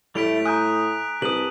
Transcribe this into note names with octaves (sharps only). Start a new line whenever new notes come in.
A2 G3 A3 E4 B6 D7 F7
G#5 A#5 D#6 F#6 G6
C2 G4 B4 A5 D#6 D#7 F#7